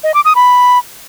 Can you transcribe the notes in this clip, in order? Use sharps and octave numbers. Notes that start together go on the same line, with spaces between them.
D#5
D6
D#6
B5